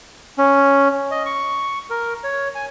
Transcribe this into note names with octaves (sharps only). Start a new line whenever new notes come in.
C#4
D#5
C#6
A#4
C#5
G#5